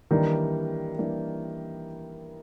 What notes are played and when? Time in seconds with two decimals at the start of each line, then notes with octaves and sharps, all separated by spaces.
0.11 D#3 E3 G3 A#3 D4
0.98 E3 G3 A#3 D4